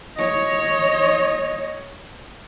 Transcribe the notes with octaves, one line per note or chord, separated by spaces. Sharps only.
C#5 D#5